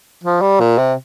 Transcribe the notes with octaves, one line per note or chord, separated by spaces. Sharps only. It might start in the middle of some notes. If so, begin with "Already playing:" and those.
F3
G3
A#2
C3